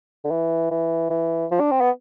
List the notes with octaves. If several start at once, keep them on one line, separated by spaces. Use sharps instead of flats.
D3
E3
E3
E3
F3
D4
C4
B3